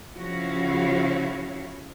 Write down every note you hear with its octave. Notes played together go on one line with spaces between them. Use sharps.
C#3 F3 E4 F#4 C#5 F5